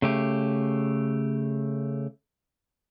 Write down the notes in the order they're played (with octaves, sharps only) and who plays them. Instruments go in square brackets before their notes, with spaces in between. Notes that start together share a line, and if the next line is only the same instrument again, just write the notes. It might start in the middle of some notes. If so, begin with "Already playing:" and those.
[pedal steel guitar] C#3 A3 G4